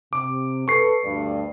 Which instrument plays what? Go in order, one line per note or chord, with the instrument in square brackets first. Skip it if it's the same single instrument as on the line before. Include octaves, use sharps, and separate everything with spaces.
[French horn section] C3 [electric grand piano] D6
[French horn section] A4 B4 [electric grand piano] C#6 C7
[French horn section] D2 G2 D5